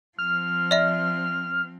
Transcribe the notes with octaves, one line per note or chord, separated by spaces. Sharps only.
F3 C4 F6
D5 E5